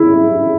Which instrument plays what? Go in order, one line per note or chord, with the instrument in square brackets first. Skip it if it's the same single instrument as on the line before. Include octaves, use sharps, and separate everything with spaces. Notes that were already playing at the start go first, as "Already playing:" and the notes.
Already playing: [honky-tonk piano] E4